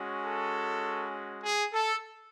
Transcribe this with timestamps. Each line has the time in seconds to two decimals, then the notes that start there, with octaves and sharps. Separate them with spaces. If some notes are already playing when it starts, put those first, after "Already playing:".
Already playing: G#3 C#4 F#4
0.21 A4
1.42 G#4
1.73 A4